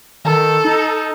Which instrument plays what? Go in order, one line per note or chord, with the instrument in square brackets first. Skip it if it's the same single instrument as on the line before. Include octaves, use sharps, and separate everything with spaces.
[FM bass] D#3 [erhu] A4
[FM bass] D#4